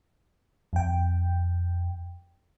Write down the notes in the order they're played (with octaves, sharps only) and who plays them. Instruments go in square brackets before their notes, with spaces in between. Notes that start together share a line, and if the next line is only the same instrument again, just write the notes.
[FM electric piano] F2 G5